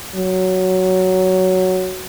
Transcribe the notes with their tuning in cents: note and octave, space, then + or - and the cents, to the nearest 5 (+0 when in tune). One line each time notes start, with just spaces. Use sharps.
F#3 +5